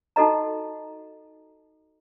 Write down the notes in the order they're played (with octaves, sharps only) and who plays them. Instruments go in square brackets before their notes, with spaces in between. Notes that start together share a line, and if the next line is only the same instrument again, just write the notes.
[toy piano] D#4 F#4 A4 D#5 A#5